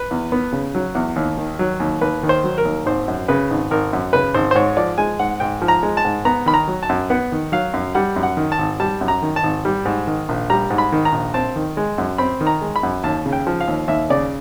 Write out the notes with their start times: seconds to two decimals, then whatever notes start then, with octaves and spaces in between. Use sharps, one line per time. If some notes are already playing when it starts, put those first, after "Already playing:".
Already playing: B4
0.11 E2
0.32 B3
0.52 C#3
0.75 F#3
0.95 E2
1.16 D#2
1.37 D#3
1.59 F#3
1.80 D#2
2.01 D#2 B4
2.23 D#3
2.29 C5
2.44 F#3
2.58 A#4
2.65 D#2
2.86 G#1 C5
3.08 F#2
3.28 C#3 B4
3.50 G#1
3.71 G#1 A#4
3.93 F#2
4.13 C#3 B4
4.34 G#1 C5
4.51 C5
4.55 G#2 C#5
4.77 F3 D5
4.98 G#3 G#5
5.19 G#2 F#5
5.40 G#2 G5
5.62 F3
5.68 A#5
5.83 G#3
5.97 A5
6.05 G#2
6.25 B3 A#5
6.46 D#3 B5
6.54 A#5
6.67 F#3
6.83 A5
6.89 F#2
7.10 B3 F#5
7.32 D#3
7.52 F#3 F5
7.74 F#2
7.95 G3 F#5
8.16 F#2
8.23 F#5
8.37 D#3
8.52 A5
8.59 G#1
8.80 G3 A5
9.01 F#2
9.08 A#5
9.22 D#3
9.36 A5
9.43 G#1
9.65 G3
9.85 G#2
10.07 D#3
10.29 A#1
10.50 G3 A#5
10.70 G#2
10.78 B5
10.92 D#3
11.05 A#5
11.12 A#1
11.34 C4 A5
11.56 D#3
11.77 G#3
11.98 F#2
12.18 C4 B5
12.41 D#3
12.47 A#5
12.62 G#3
12.76 B5
12.83 F#2
13.03 D#2 A5
13.26 C#3
13.33 G5
13.47 F3
13.61 F5
13.68 D#2
13.88 D#2 E5
14.10 C#3 D5